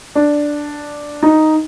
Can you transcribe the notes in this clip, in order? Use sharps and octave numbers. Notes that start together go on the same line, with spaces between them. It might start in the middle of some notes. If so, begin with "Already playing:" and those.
D4
D#4